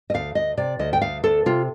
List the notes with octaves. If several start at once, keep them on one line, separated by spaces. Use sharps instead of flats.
D#5
D2 F5
D2 D#5
C3 D5
D2 D#5
G5
D2 F5
D2 A4
C3 F4